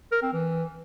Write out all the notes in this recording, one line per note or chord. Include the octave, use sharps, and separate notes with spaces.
A#4
C4
E3